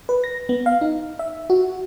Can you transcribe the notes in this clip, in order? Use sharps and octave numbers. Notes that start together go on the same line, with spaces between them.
B4
A#6
B3
F5
D#4
E5
F#4